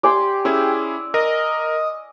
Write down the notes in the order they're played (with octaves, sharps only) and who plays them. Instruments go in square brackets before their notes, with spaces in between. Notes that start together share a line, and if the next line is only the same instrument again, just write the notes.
[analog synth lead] G4 [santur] D5 G#5 C6
[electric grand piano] C#4 E4 G#4 [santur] E6
[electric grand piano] A#4 [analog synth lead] D#5